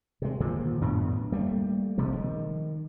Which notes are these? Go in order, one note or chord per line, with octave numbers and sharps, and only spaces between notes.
C3 G#3
A#2 D3 D#3 F3
F#2 A2 B3 D4
G3 A3 A#3
A#1 C3 F3 G#3
D#3